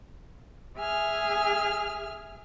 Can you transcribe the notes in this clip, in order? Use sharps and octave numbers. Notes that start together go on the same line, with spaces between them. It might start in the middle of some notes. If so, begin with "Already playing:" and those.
G#4 E5 G#5 F6